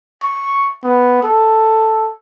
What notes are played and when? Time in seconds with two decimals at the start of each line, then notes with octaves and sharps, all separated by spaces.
0.23 C#6
0.84 B3
1.23 A4